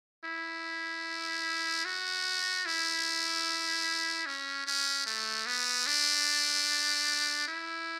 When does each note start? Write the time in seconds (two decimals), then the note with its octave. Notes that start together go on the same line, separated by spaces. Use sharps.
0.25 E4
1.85 F#4
2.66 E4
4.26 C#4
4.66 C#4
5.06 A3
5.46 B3
5.87 D4
7.48 E4